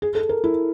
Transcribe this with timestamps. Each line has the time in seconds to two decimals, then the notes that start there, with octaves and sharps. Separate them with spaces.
0.02 G#4
0.15 A4
0.29 A#4
0.44 E4